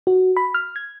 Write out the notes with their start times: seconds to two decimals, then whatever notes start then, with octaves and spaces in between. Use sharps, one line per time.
0.07 F#4
0.37 B5
0.54 F6
0.76 G#6